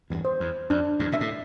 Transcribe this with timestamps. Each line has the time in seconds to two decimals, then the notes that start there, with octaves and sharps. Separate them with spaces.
0.10 E2 G2
0.25 C5
0.40 E2
0.70 F2 D4
0.99 E2 G2
1.12 A#2 E5
1.21 A2